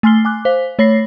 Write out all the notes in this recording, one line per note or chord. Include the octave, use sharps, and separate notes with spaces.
A3 G#5 C6 F6 C7 G7
G#5 D6 F#6
C5 F5 B6
A3 C#5 B5 A#6 C7